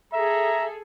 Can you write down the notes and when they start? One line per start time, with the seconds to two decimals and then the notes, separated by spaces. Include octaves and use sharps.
0.14 G#4 A4 E5 A#5